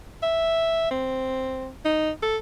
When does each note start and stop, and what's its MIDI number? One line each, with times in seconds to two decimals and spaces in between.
0.23 0.88 76
0.91 1.69 60
1.85 2.11 63
2.22 2.37 69